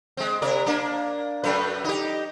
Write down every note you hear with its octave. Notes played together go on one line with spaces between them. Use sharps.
G#3 C4
C3 A#4 D5
A#3 D4
F#2 A3 B4
D#4 G4